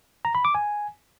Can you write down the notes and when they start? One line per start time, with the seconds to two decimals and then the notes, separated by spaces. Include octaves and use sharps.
0.25 A#5
0.35 B5
0.45 D6
0.55 G#5